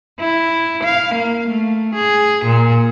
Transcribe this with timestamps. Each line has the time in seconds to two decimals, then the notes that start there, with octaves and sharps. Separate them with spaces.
0.20 E4
0.83 F5
1.14 A#3
1.49 A3
1.95 G#4
2.45 A#2